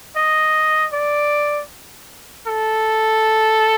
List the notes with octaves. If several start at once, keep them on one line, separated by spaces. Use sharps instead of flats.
D#5
D5
A4